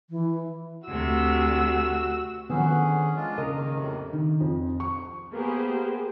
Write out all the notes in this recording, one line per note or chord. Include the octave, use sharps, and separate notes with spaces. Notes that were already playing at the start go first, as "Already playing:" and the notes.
E3
D2 C3 F#4 E6
D3 D#3 F3 B3 C#4 G#4
G#3 D4 F4
C#3 A#4 D#5
D#3 A#3
F2 A2 C3
D#3
F2
C#6
A#3 B3 G4 G#4 C5